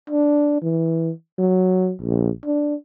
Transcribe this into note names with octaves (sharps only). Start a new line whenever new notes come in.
D4
E3
F#3
A#1
D4